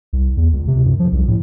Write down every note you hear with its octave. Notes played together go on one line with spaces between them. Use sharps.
C2
E2
C#2
C3
F#2
F3
C2
A2